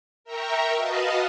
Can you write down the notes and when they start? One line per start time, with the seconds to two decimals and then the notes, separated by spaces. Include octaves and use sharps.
0.24 A#4 E5 G5 A#5 C#6
0.76 F#4 B4 D#5 F5 A5 D#6